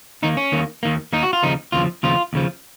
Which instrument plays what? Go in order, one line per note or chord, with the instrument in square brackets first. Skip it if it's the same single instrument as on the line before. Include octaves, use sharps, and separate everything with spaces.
[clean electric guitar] D#2 D#3 A#3 D#4
C#4
D#2 D#3 A#3
D#2 D#3 A#3
D#2 D#3 A#3 D#4
F#4
F4
D#2 C#3 F3 D#4
D#2 C#3 F3 F4
D#2 C#3 F3 F4
D#2 C#3 F3